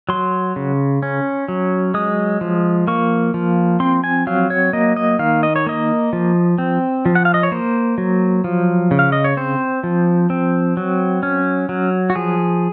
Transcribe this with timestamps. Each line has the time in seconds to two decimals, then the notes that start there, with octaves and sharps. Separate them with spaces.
0.09 F#3 C6
0.56 C#3
1.03 C#4
1.48 F#3
1.94 G#3 D#6
2.41 F3
2.87 A#3 C#6
3.34 F3
3.80 C4 C6
4.04 G#5
4.27 F#3 F5
4.50 C#5
4.73 A#3 D#5
4.96 D#5
5.19 D#3 F5
5.43 D#5
5.56 C#5
5.66 A#3 D#5
6.13 F3
6.58 C4
7.06 F3
7.15 F#5
7.25 F5
7.34 D#5
7.43 C#5
7.52 A#3 C5
7.98 F#3
8.44 F3
8.91 C#3
8.99 F5
9.12 D#5
9.24 C#5
9.37 C4 C5
9.84 F3
10.30 C4
10.77 F#3
11.23 C#4
11.69 F#3
12.10 F#4
12.15 F3 G#4